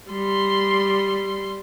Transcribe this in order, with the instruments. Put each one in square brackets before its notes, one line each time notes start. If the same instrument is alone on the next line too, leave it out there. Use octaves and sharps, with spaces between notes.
[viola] G3 C6